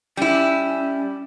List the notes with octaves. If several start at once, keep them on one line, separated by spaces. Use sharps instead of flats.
G3 C#4 E4